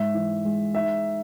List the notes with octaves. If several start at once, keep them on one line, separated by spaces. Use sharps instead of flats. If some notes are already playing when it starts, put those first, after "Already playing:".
Already playing: G#2 E5
E3
G#3
D#4 E5